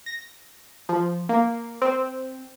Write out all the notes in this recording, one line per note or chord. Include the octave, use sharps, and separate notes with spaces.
A#6
F3
A#3
C4